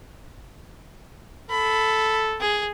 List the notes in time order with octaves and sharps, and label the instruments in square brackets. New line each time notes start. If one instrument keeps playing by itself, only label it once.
[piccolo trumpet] A4 [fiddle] B5
[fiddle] G#4